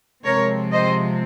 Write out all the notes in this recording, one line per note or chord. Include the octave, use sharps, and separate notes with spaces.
C3 F3 G#3 C4 A#4 C#5
C5 D#5